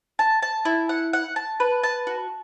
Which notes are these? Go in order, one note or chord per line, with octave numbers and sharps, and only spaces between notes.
A5
A5
E4
F#5
F#5
A5
B4
A5
F#4